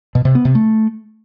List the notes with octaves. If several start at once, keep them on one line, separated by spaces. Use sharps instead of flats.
B2
C3
B3
C3
A3